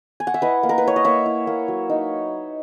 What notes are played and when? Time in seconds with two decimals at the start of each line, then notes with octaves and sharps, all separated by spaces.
0.20 G#5
0.27 F#5
0.34 E5
0.42 E4 B4 D#5
0.63 A#3
0.69 A#4
0.78 B4
0.84 E4 C#5
0.96 D#5
1.04 A#3 C#5 E5
1.26 E4
1.47 A#3
1.68 F#3
1.90 D#4